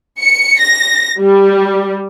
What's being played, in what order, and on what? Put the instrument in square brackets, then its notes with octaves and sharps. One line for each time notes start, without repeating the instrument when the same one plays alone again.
[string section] C#7
A#6
G3